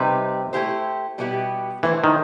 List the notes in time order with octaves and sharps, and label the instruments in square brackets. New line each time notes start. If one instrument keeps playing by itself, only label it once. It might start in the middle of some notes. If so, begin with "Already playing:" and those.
Already playing: [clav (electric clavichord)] C3 [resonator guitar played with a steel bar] G3 D#4 G4 B4
[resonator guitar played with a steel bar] A3 E4 G4 C5
B2 G3 B3 E4 G4
[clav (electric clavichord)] E3 [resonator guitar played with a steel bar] A3 E4 A4 C5
[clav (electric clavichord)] D#3